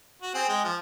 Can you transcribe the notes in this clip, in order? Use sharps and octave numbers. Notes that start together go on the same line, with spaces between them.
F#4
C4 G#4
G#3 G5
F3